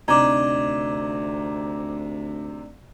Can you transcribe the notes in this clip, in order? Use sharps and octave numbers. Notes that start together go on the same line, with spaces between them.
D2 C3 D4 D#4 A#5 D6 G#6